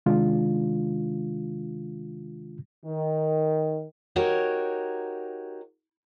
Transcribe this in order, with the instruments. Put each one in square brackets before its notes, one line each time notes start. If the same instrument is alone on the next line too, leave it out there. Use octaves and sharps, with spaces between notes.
[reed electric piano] C3 D#3 G#3 D4 F4
[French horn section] D#3
[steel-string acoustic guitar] D#4 F#4 G4 A#4 C#5